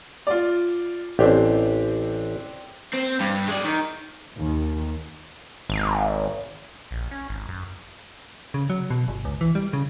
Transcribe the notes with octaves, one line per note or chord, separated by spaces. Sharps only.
F4 D5
A1 C4 D4 G4
C4
G2
G#3 D5
D#3
D#2
G#1
A#1
C#4
G#1
F#2
C#3
F#3
B2
G1
C#2
E3
G3
C#3